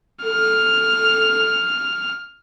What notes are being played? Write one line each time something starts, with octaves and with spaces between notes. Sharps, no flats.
A4 F6